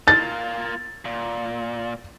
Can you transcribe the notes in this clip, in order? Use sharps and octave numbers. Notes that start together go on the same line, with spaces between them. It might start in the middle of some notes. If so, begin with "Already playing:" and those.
A#3 F4 A6
A#2